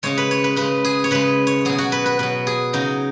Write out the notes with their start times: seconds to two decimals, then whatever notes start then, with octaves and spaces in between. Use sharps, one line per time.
0.03 C#3 G#3 C#5
0.18 B4
0.31 C#5
0.44 B4
0.56 C#3 G#3 B4
0.84 G#4
1.04 C#5
1.11 C#3 G#3 B4
1.47 C#5
1.65 B2 F#3 G#4
1.78 F#4
1.92 B4
2.06 B4
2.19 B2 F#3 B4
2.47 G#4
2.73 C#3 F#3 D#4